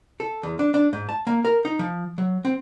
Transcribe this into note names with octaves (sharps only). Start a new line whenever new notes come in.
A4
E2
D4
D4
G#2
A5
A#3
A#4
D#4
F3
F#3
C4